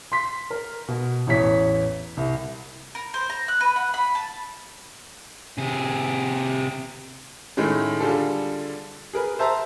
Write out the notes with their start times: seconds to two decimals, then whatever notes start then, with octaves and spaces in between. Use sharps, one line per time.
0.12 C6 B6
0.50 A#4
0.88 B2
1.27 A1 E2 C#5 B6
2.17 C2
2.95 A#4
3.14 C5
3.30 A#5
3.48 F#6
3.61 B4
3.76 F#5
3.94 B5
4.15 A5
5.58 C3 G#4
7.57 A2 D#3 G#3 A3 C#4
8.00 D3 G3 F4 G#4 A4
9.13 G#4 A#4 B4
9.39 C5 E5 A5 A#5